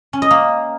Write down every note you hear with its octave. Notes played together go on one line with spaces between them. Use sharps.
C#4
D#5
A#3